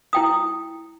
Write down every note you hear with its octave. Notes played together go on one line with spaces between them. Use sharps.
E4 G5 D#6